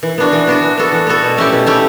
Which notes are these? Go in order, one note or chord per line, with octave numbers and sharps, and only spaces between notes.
E3
B3 D4 F#4
E3
B3 D4 F#4
E3
B3 F#4 A4
E3
B3 F#4 A4
B2
A3 C#4 E4 G4
B2
A3 C#4 E4 G4